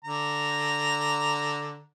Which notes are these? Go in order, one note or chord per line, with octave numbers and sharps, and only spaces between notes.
D3 A#5